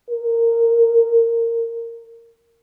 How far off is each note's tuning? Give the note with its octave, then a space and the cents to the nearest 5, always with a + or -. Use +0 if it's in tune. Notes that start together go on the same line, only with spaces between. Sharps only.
A#4 -15